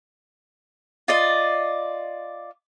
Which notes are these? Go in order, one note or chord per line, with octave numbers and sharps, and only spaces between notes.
F4 D5 D#5